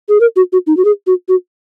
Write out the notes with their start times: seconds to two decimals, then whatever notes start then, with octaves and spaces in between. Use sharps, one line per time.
0.09 G#4
0.20 A#4
0.36 F#4
0.52 F#4
0.67 D#4
0.77 F#4
0.85 G#4
1.07 F#4
1.28 F#4